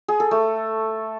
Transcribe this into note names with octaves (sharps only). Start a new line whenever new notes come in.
G#4
A4
A3